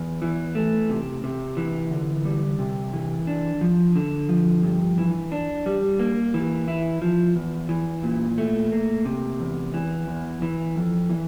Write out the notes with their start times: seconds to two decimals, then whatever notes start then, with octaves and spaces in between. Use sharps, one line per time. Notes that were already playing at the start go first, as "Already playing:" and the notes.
Already playing: E2
0.22 E3
0.55 A3
0.90 C3
1.24 C3
1.57 E3
1.91 D3
2.25 G3
2.59 C3
2.93 E3
3.27 D4
3.61 F3
3.96 D3
4.29 F3
4.63 G2
4.98 E3
5.32 D4
5.66 G3
5.99 A#3
6.34 E3
6.68 E4
7.02 F3
7.35 E2
7.69 E3
8.03 A#2
8.38 A3
8.72 A#3
9.05 C3
9.40 E2
9.74 E3
10.08 E2
10.42 E3
10.76 F2
11.09 E3